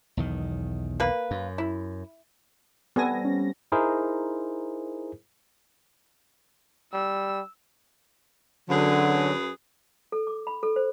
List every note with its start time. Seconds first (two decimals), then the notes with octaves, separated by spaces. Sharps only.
0.17 B1 E2 D#3
1.00 A#3 B4
1.31 F#2
1.58 E4
2.96 G3 B3 C4 A4 G#5 A#6
3.25 C#4
3.72 D#4 E4 G#4 A#4 C5
6.94 G3 E6
8.70 F#2 D3 F#3 G#4 B4
10.12 A4
10.27 D6
10.47 B5
10.63 A4
10.76 C5